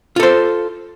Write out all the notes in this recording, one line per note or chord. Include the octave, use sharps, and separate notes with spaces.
F4 A4 C5